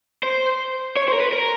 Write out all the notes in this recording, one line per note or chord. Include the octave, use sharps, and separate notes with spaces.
C5
C#5
C5
A#4
B4
A#4